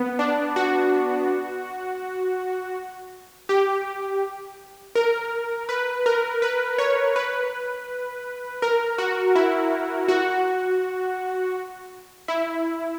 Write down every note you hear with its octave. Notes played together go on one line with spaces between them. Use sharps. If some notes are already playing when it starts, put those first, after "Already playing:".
Already playing: B3
D4
F#4
G4
A#4
B4
A#4
B4
C#5
B4
A#4
F#4
E4
F#4
E4